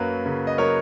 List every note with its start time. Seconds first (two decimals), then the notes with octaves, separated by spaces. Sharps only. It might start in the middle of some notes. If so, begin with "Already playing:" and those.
Already playing: F#2 F#3 A#3 B4
0.26 C#3
0.47 D#5
0.58 F#3 A#4 C#5